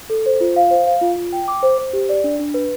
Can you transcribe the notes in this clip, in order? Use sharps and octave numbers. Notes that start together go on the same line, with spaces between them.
A4
C5
F4
F5
C5
F5
F4
F4
G5
D6
C5
C5
G4
D5
D4
D4
B4